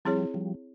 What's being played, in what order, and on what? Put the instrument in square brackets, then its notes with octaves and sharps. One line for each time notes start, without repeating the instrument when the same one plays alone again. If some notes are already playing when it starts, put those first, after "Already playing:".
[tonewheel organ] F3 G3 [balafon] C4 E4 G#4 C#5
[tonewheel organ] F3 G3